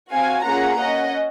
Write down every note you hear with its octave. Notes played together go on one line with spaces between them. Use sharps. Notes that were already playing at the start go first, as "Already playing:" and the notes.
C4 F#4 F5 G#5
A#3 C#4 F4 G#4 F#5 A#5
C#4 F#4 D#5 F#5